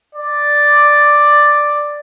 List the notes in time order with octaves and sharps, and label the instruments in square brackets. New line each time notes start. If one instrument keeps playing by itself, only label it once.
[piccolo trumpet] D5